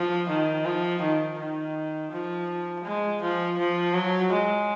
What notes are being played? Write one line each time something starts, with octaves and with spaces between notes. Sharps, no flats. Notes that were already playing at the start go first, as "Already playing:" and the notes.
Already playing: F3
D#3
F3
D#3
D#3
F3
G#3
F3
F3
F#3
G#3